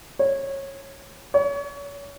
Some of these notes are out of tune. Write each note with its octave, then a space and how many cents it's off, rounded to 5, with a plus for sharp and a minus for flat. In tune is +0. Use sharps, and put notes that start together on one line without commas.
C#5 -20
C#5 +30